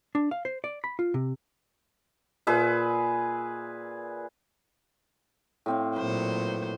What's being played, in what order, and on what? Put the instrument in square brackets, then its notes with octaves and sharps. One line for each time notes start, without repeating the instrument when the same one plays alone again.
[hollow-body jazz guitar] D4
F5
C5
D5
B5
F4
C3
[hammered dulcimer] A#2 G#4 B4 E5
A2 C4 F5
[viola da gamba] A#2 F#3 C5 [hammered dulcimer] B4